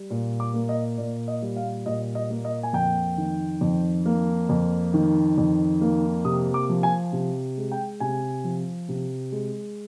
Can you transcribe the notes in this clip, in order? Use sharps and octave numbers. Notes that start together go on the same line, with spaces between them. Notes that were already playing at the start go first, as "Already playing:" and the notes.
Already playing: G3
A#2
D6
A#3
D#5
A#2 D5
D#5
G3
F5
A#2 D#5
D#5
A#3
D#5
G#5
F2 G5
D#3
F2
A#3
F2
D#3
F2
A#3
C3 D#6
D6
F3
G#5
C3
G#3
G5
C3 G#5
F3
C3
G#3